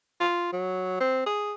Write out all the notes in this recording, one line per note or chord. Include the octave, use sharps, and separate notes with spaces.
F4
F#3
C4
G#4